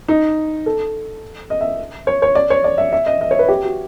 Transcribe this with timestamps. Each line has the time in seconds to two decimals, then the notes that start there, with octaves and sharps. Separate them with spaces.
0.08 D#4
0.66 A4
1.50 D#5
1.61 E5
2.07 C#5
2.22 C#5
2.35 D5
2.50 C#5
2.64 D5
2.78 E5
2.93 E5
3.06 D#5
3.21 D#5
3.31 C#5
3.39 B4
3.49 G4
3.63 F#4